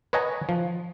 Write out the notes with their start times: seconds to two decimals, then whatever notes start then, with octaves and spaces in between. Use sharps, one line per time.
0.13 B4 C#5 D#5 F#5 G#5 A#5
0.49 F3